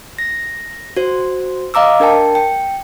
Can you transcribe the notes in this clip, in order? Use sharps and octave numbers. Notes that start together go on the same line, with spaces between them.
A#6
F#4 C5
D#5 F5 A#5 D6 E6
D4 A#4 G5 A5
G5